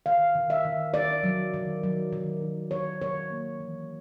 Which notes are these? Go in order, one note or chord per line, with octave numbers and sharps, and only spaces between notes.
D#3 F5
D#3
E5
D#3
D#3 D5
F#3
D#3
F#3
D#3
D#3
D#3 C#5
D#3 C#5
A#3
E3